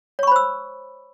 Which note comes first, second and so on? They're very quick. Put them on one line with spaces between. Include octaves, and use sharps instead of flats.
C#5 C#6 B5 C5 E6